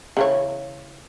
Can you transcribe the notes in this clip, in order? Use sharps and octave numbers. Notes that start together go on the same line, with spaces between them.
C#3 E3 C#5